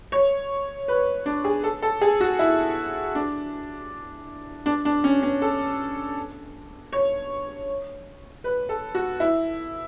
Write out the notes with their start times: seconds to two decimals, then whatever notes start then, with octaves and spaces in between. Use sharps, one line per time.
0.12 C#5
0.88 B4
1.26 D4
1.44 G#4
1.64 A4
1.82 A4
2.01 G#4
2.21 F#4
2.39 E4
3.15 D4
4.66 D4
4.85 D4
5.04 C#4
5.22 C#4
5.42 A4
6.93 C#5
8.44 B4
8.69 A4
8.95 F#4
9.20 E4